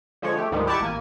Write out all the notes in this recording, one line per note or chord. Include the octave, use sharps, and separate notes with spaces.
D3 F3 G#3 C#5
A3 G4
D2 G#2 D#3 F3 G3 G#3
E4 G4 D5 F#5 A5 C#6
A1 A#3 G#5